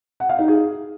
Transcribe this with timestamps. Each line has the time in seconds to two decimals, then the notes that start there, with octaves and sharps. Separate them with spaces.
0.20 F#5
0.29 F5
0.39 D#4
0.48 G#4